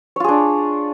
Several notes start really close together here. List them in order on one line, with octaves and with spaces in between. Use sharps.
C#5 F4 G#4 D4